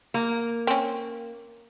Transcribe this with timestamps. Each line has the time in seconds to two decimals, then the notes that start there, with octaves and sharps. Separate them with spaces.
0.14 A#3
0.67 C4 C#4